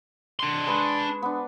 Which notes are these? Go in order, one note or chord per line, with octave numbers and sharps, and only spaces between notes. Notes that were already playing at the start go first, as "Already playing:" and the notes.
D4 C6
G#3 B4 C#6
B3 D4